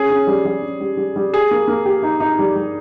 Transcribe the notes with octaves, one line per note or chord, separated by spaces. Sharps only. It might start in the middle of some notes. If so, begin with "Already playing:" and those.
Already playing: C#4 G#4
C#4
G3
G3
C#4
G3
G3
G3
G4 G#4
A#3
A#3
G4
D#4
D#4
G3
G3